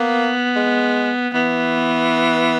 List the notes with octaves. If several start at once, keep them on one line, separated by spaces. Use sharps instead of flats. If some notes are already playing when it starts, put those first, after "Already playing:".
Already playing: A#3 B3
G#3
E3 B3